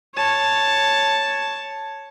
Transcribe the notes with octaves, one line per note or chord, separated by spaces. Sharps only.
C#5 A5